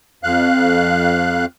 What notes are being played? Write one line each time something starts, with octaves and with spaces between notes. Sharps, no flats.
F2 F5 F#6